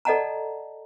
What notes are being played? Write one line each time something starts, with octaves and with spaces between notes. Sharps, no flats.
A4 D5 D#5 F#5 A5 A#5